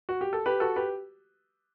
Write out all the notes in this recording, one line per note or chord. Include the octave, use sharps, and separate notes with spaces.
F#4
G4
A4
G4 B4
F#4 A4
G4 B4